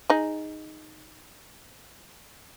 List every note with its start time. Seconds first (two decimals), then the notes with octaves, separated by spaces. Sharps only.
0.10 D#4 G#4